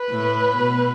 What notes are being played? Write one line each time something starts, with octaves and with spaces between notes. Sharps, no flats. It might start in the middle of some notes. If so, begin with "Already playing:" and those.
Already playing: B4
A2
B2